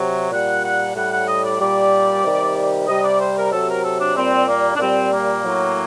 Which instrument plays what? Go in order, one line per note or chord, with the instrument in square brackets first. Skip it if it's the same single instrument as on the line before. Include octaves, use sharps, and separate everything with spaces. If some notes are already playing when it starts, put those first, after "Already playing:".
Already playing: [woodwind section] C3 F#3
A#2 G3 F#5
F#5
A2 G3 F#5
F#5
D#5
D5
A#2 G3 D5
C3 D#3 G3
C3 G3 D#5
D5
C5
A#4
C3 F#3 A4
A#4
A4
D4
A#2 G3 C4
A#3
D4
A#2 G3 C4
A#3
A2 F#3